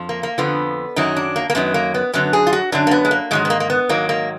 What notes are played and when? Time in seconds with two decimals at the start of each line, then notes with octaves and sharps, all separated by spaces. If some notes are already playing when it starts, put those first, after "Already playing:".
Already playing: F2 F3
0.09 A#3
0.23 A#3
0.38 F2 D3 F3 B3
0.96 F#2 D#3 F#3 D#4
1.16 D4
1.36 A#3
1.50 A#3
1.55 F#2 D#3 F#3 B3
1.74 A#3
1.94 B3
2.14 F#2 D3 F#3 B3
2.33 G#4
2.47 F4
2.53 F#4
2.72 F#2 D3 F#3 D4
2.87 A#3
2.91 B3
3.05 G#3
3.11 A#3
3.31 G#2 D#3 F#3 G#3
3.45 B3
3.50 A#3
3.60 A#3
3.70 B3
3.89 G#2 D#3 F#3 A#3
4.09 A#3